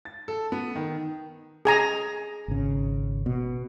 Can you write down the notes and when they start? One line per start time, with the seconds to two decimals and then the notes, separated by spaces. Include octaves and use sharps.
0.05 A6
0.28 A4
0.52 B3
0.75 D#3
1.65 G#4 G#5 A#5
2.48 G#1 C#3
3.26 B2